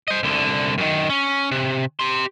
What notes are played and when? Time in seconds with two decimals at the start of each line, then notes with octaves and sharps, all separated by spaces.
0.08 C5 D#5
0.23 C2 D3
0.78 F#2 D#3
1.10 C#4
1.51 C3
1.99 G4 C6